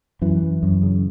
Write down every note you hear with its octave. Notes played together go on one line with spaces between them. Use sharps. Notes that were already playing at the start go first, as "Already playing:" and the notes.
F#2 E3
F#2
F#2
C#3